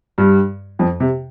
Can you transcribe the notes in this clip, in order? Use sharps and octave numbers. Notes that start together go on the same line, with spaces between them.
G2 G3
F2 F3
C3